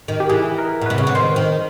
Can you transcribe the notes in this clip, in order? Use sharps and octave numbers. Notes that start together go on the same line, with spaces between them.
D#3
G4
E3 G#4
A#4
B2
C3 B4
C#3
D3
D#3 C5
D#3